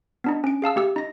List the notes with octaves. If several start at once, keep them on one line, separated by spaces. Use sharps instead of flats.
B3 D4 D#4
C#4 D7
G#4 F5 A5 E6
A3 G4 E6
D#4 A#6